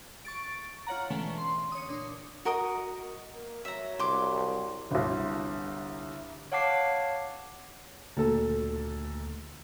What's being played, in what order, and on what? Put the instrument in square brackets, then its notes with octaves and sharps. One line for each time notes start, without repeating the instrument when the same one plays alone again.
[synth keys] C#6 A6 D7
F4 C#5 F#5 A#5
B2 D3 E3 G#3 A3 C#4
C6
C#5 D#6
A#2 D4
[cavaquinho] F#4 A#4 D#5 D#6
[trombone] A#3
[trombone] F#3 [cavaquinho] E5 A#5
[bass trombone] C2 [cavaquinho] C6 D6
[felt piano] G1 C2
[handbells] C#5 F5 F#5 A5 D6 C7
[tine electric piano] D2 [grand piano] A#2 A4